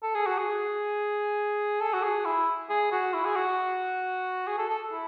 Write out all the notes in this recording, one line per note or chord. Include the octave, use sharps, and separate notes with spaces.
A4
G#4
F#4
G#4
A4
F#4
G#4
E4
G#4
F#4
E4
G#4
F#4
G#4
A4
A4
E4